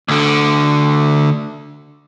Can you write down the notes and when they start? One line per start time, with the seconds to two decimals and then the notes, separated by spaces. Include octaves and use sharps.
0.08 D2 D3